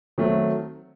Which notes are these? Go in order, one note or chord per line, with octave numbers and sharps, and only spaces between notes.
D#3 F#3 A3 C4